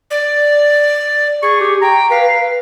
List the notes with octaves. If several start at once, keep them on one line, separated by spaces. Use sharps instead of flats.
D5
G#4 C#6
G4
G5 A#5
B4 F5